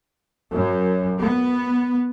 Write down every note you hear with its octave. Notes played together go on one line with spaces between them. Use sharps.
F#2
B3